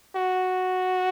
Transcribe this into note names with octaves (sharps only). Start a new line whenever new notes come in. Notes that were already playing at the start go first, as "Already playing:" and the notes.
F#4